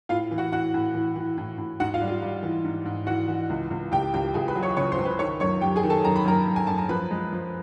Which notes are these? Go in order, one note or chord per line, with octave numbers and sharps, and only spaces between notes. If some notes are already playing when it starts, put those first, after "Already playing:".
A2 F4 F5
E3
F#4 F#5
A2 F#4 F#5
A2
E3
E3
A2
A2
G#2 F#4 F#5
F4 F5
G3
F4 F5
G3
E3
G#2
G#2
E3 F#4 F#5
E3
C#2
C#2
C#2 G4 G5
C#2 G4 G5
C#2 G#4 G#5
B4 B5
F#3
C#5 C#6
C#3 C#5 C#6
C5 C6
C#2
B4 B5
D#3 C#5 C#6
F#2 C#5 C#6
F#2 G4 G5
G#4 G#5
D#3
A4 A5
F#2 A#5
B5
F#2 A#4 A#5
F#2
G#5
F#2 A5
A#5
F3 B4 B5
G#3
F3